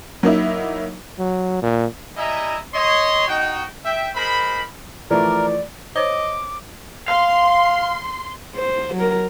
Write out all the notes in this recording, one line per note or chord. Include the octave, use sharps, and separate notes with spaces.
F#3 A#3 D#4 E4
F#3
A#2
G3 E4 D#5 E5 G#5 A#5
C#5 D#5 C6
D#4 F#4 G5
E5 G5
G#3 A#4 C5 B5
E3 F3 A3 A#4 D5
C5 C#5 D#5 D6
F5 C6
C5
F#3 A#4